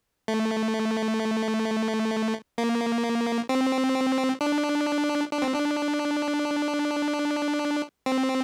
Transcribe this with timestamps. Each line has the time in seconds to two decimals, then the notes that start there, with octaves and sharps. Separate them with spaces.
0.28 A3
2.58 A#3
3.49 C4
4.41 D4
5.33 D4
5.42 C4
5.54 D4
8.06 C4